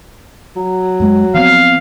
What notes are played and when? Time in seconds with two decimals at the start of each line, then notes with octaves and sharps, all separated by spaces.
0.56 F#3
1.00 F#2 G#3
1.34 F3 B3 C4 F5